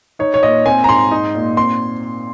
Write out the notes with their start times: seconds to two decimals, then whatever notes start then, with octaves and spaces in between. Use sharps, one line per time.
0.19 D#4 C#5
0.34 C#5
0.43 A#2 D#5
0.66 C4 G#5
0.84 A#5
0.89 G#2 C6
1.11 D#4
1.35 A#2
1.57 C4 C6